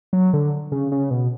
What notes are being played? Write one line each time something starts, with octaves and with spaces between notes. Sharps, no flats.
F#3
D3
C#3
C#3
B2